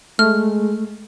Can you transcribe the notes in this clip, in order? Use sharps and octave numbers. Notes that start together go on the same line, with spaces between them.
G#3 A3 F6